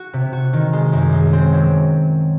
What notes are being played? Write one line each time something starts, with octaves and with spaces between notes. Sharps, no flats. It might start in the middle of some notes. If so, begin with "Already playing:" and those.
Already playing: F#4
C3
F#4
D#3
G#3
F#2
G#3
C4
F#3